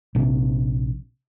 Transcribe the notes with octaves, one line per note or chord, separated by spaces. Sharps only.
A#1 C3